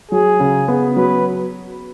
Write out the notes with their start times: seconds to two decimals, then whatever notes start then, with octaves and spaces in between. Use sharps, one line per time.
0.11 F#3 G#4
0.40 C#3
0.68 B3
0.96 F#3 B4